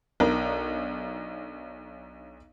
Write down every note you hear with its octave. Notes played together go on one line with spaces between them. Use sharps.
B1 D4 D#4 A#4 A#5